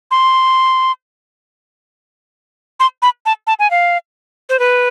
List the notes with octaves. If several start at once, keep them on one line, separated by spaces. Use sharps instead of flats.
C6
C6
B5
A5
A5
G#5
F5
C5
B4